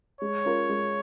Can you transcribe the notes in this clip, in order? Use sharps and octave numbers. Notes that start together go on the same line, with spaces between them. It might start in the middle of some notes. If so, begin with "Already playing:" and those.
G#3 C#5
C#4 F4 A#4
G#3